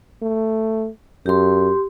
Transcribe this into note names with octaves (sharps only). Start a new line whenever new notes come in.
A3
F#2 G4 C6